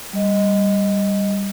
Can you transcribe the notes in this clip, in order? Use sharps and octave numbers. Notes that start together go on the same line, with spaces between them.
G3 D#5